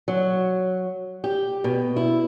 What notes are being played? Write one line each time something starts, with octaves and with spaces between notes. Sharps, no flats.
F#3
G4
B2
E4